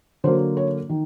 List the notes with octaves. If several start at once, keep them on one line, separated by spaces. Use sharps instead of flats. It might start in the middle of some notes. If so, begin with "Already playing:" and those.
D3 F#3 A#3 C5
C#5
D#3